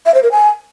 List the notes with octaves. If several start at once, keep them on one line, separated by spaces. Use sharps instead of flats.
E5
C5
A#4
G#5